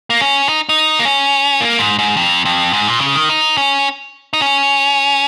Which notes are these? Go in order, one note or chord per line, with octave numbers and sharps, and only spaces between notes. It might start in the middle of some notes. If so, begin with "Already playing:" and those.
A#3
C#4
D#4
D#4
A#3
C#4
A#3
G#2
G#2
F2
F2
G#2
A#2
C#3
D#3
D#4
C#4
D#4
C#4